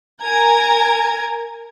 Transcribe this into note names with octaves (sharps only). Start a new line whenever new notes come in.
A#4 G#5 A#5 G#6